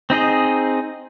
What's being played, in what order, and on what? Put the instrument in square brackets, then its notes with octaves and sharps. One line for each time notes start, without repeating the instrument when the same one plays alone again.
[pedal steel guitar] C4 D#4 G#4 D#5